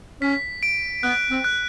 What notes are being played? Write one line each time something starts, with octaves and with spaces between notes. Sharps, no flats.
C#4 B6
D7
B3 F#6
C4
F#6